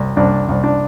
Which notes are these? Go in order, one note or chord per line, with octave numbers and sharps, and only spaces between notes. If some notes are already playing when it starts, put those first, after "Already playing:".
Already playing: C2
C2 D4
C2
D4